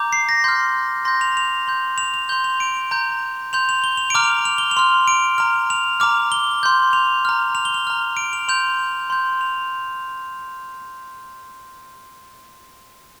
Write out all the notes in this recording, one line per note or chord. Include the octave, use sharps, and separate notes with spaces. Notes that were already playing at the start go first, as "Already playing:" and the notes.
Already playing: A#5 D6 G6
C7
A#6
C6 F6 G6
C6 G6 A#6
F7
F7
C6 G6
F7
F7
C6 G6 G7
F7
D7
A#5 G6
C6 G6 F7
F7
G7
F7
A#5 D6 F6 D7
F7
F7
G7
F7
C6 F6
D7
A#5 F6
F7
A#5 D6 F6
G7
C6 G6
F7
A#5 F6
F7
G7
F7
A#5 F6
D7
F7
C6 G6 F7
C6 G6
F7